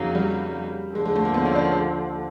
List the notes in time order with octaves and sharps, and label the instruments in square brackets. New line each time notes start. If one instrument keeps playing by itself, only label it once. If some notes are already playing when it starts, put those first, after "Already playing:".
Already playing: [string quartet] F2 C#3 F#3 A#3 D#4
[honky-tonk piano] G3
[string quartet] D#2 D3 F3 [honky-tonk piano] G#3
[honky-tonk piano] G#3
A3
A#3
B3
C#4
D4
C#4